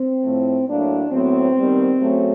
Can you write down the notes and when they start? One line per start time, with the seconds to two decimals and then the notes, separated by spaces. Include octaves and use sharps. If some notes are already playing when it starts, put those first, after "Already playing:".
Already playing: C4
0.23 A2 F3 A3
0.68 A2 F#3 A#3 D4
1.12 A2 F#3 B3 C4
1.57 D#3 G3 B3
2.01 C#3 F#3 A3